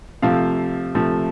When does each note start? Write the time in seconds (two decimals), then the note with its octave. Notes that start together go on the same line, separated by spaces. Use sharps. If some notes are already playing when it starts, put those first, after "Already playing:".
0.22 C3 F3 A3 F5
0.95 C3 F3 A3